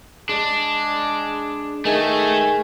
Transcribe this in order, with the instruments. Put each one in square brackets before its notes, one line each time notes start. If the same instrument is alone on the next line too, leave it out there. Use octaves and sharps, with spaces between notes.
[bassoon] G#3 [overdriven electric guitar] D4
[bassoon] D#3 [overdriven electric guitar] A3 [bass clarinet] G#4